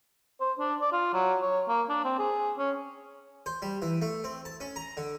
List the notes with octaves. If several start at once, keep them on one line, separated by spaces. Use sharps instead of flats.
C5
D4
D5
F4
F#3
C#5
A#3
D4
C4
G#4
C#4
C5
G3
E3
A3
C4
A5
C#4
A#5
D3